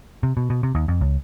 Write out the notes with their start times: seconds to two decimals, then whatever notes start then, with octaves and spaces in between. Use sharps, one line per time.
0.23 C3
0.37 B2
0.50 B2
0.63 C3
0.75 D#2
0.88 F2
1.01 C#2